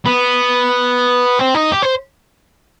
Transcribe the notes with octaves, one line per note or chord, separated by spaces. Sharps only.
B3
C4
D#4
G4
C5